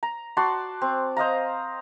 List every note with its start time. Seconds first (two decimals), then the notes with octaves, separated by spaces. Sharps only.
0.03 A#5
0.37 F#4 D5 A5 C6
0.81 C4
1.17 C5 D#5 F5 A#5